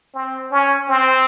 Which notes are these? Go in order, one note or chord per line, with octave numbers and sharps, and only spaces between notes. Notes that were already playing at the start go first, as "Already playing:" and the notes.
C4
C#4
C4